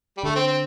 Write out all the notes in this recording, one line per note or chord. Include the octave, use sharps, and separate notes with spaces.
G3
D3 A3
C4
C4